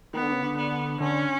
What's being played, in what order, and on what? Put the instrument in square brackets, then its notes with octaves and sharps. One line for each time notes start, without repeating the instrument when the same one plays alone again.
[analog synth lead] D#3 [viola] B3
[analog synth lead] D3
C#3
D3
[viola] B3
[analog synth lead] D3 [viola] C#4